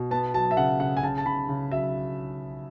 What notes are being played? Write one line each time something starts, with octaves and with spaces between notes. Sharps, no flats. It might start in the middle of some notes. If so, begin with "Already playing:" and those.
Already playing: B2
B3 A5
F#3 A5
E5
C#3 F#5
C#3 F#5
G#5
C#3 A5
A5
C#3 B5
C#3
F#3 E5